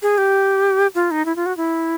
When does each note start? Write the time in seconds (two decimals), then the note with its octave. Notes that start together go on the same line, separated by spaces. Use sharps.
0.02 G#4
0.18 G4
0.95 F4
1.11 D#4
1.25 E4
1.36 F4
1.46 F#4
1.57 E4